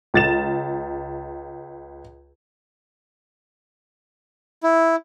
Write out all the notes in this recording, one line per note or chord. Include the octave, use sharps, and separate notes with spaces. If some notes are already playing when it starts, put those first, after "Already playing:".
C#2 A6 E7
E4